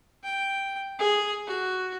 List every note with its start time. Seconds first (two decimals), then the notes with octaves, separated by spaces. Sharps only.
0.23 G5
0.98 G#4
1.47 F#4